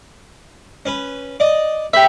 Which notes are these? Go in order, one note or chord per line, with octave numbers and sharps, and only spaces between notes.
C#4 B4
D5 D#5
G4 E5 B5